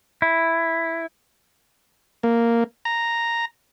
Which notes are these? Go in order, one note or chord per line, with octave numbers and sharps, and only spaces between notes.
E4
A#3
A#5